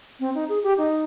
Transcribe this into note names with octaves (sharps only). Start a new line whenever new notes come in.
C4
D#4
G#4
G4
D#4